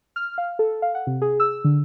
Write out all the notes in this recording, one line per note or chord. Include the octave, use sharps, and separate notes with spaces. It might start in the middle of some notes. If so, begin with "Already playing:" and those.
F6
F5
A4
F5
F#5
C3
G#4
E6
D3